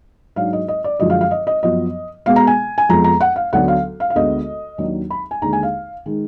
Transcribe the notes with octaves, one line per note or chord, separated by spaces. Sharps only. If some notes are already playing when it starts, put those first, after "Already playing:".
G#2 F#3 D4 F5
D#5
D#5
D5
F#2 D3 F3 G#3 D#5
F5
F5
D#5
D#5
F#2 F3 B3 D#5
B2 G#3 B3 F5
A#5
G#5
G#5
F2 F3 G#3 B3 A#5
A#5
F#5
F5
D2 D3 F#3 B3 D4 F#5
F5
F5
F5
D2 D3 G#3 B3 D4 D#5
D#2 D#3 F#3 D4
B5
G#5
D#2 D3 G#3 A#5
G#5
F5
D#3 G#3